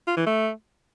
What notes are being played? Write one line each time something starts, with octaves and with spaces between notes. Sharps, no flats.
F4
E3
A3